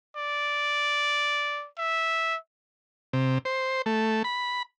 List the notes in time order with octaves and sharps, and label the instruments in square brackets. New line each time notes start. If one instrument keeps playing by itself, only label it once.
[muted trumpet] D5
E5
[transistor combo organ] C3
C5
A3
B5